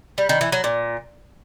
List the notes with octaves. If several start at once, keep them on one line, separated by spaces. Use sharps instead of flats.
G3
D#3
E3
F#3
A#2